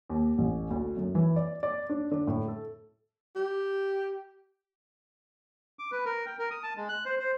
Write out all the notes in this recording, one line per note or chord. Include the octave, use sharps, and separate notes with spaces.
D#2
A1
D2
F#2
E3
D5
D5
D4
D3
A2
A4
G4
D6
B4
A#4
G5
A#4
D#6
A5
G#3
F#6
C5
C5